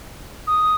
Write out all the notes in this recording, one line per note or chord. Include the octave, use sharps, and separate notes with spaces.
D#6